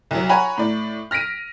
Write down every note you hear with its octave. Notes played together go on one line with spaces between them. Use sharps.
C2 F#3
C#5 F#5 G#5 A#5 B5
A2 D5
F6 A#6 B6 D7 D#7